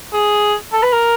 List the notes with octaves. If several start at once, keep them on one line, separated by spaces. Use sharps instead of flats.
G#4
A4
B4
A#4